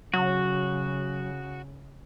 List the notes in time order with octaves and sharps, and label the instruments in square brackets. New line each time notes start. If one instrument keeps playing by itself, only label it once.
[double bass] C#3 [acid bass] F#3 [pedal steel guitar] F#4